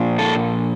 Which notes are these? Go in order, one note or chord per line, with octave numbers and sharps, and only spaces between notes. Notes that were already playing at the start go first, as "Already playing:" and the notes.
Already playing: A#2 F3
A4